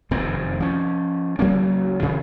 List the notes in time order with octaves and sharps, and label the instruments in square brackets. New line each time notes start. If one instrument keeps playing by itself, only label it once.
[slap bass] F1 F#2 D#3 C4
F3 C#4
C#2 F#3 A#3 C#4
C3 D#3 E3